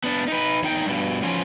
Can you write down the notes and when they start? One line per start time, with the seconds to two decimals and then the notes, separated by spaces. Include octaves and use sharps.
0.04 B3 D4
0.28 D#4 B4
0.63 E2 D#4 G5
0.85 G2 B2
1.22 E3 F3 C#4 F4